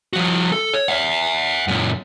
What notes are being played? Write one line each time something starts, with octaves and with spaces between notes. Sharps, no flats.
F3 F#4
A4
C#5
E5 F#5
F#2 A#2